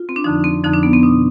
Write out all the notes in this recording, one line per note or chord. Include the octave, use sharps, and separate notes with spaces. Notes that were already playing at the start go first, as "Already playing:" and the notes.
Already playing: F4
C4
D4
F2 D3 F3 D#4
C4
F2 D3 F3 D#4
D4
B3
C4
B2 D4